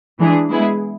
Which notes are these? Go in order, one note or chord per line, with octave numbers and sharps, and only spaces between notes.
E3 G#3 D4 G#4
G#3 B3 E4 G#4